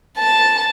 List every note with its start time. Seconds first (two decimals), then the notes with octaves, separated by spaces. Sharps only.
0.19 A5